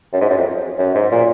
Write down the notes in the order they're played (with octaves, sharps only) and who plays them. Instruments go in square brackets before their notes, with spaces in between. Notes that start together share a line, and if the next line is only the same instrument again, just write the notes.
[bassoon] F#2
G#2
F#2
F2
F#2
G#2
A#2